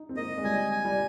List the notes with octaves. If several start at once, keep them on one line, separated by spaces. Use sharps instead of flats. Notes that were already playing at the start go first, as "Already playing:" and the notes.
Already playing: D#4
C4
A#3 D#5
G#3
G3 G#5
G#5
G3